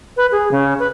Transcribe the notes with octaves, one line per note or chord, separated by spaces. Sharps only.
B4
G#4
C#3
B4